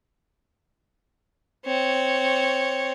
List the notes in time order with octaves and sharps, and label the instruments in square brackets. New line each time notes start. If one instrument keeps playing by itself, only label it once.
[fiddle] C4 C#5